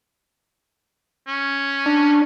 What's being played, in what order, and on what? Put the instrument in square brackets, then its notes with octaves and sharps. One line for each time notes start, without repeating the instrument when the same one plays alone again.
[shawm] C#4
[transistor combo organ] D4